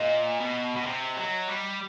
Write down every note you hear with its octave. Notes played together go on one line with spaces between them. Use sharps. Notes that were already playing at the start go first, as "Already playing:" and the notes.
Already playing: A#2 D#5
B2
B2
C3
F#3
G3